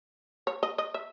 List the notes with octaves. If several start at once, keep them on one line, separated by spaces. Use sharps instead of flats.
C#5
D#5
D#5
E5